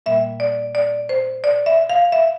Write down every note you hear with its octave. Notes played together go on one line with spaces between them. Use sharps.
A#2 G3 A#3 E5
D5
D5
C5
D5
E5
F5
E5